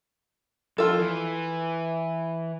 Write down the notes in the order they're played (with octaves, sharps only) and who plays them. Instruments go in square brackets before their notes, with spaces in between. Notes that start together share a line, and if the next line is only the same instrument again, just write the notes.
[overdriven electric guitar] F2 [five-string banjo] F4 A4
[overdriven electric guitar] E3